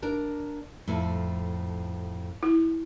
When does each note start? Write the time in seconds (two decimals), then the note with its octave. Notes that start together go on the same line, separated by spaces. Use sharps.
0.02 D4 A#4
0.87 F2 A2
2.43 E4